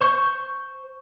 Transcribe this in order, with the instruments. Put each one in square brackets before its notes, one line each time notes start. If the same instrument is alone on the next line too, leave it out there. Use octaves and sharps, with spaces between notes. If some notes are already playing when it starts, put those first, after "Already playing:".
[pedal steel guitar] C5 C#6 G6